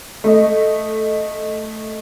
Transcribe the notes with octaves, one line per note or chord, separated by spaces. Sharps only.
A3 D#5